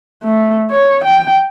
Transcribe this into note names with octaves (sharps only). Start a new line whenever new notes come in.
A3
C#5
G5